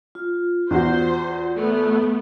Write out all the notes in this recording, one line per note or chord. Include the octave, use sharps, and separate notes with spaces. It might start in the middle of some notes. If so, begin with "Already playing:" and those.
F4
E2 F#4 C5
A3 B3